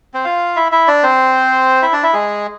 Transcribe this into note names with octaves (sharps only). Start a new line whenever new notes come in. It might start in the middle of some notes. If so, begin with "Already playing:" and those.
C4 C5
F4 F5
E4 E5
E4 E5
D4 D5
C4 C5
E4 E5
D4 D5
E4 E5
G#3 G#4